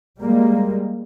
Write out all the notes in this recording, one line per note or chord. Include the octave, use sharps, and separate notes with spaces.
G3 G#3 A#3